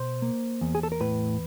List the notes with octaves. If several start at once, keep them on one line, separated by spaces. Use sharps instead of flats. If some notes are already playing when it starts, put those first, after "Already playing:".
Already playing: B2 C5
A#3
E2
G#4
A4
A#4
A2 B4